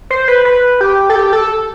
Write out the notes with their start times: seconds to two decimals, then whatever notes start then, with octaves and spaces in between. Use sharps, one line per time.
0.10 C5
0.28 B4
0.45 B4
0.81 G4
1.10 A4
1.16 G4
1.33 A4